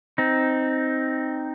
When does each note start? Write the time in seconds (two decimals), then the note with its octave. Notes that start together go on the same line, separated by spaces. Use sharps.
0.18 C4 D#4